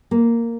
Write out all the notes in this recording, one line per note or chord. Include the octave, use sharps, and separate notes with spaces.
A#3